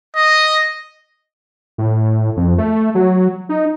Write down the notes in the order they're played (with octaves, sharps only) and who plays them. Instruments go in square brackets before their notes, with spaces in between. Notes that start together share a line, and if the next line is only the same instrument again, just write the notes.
[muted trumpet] D#5
[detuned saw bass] A2
F2
A3
F#3
D#4